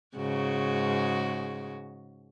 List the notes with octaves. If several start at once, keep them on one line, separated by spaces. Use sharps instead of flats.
G#2 C#3 F#4